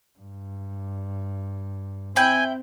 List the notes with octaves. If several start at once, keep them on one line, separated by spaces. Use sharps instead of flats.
G2
C4 E4 G5 G#5